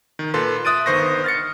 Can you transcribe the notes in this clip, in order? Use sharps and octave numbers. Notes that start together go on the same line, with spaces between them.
D#3
A#2 A4 B4 C6
E5 D#6 F#6 A6 D7 D#7
G1 D#3 B4 C5 C#6 A#6
F6 A6 C#7